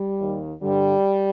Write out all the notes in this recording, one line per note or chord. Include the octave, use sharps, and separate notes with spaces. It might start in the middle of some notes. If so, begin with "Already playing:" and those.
Already playing: G3
D#2 D#3
G2 D3 G3